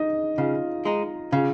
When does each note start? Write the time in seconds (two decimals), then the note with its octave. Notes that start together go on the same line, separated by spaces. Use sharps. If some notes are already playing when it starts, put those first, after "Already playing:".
Already playing: D#4 D#5
0.38 C#3 F4 F5
0.85 G#3 D#4
1.32 C#3 F4 F5